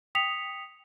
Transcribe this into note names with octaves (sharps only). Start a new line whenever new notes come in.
G5 D#6 B6 C#7 F7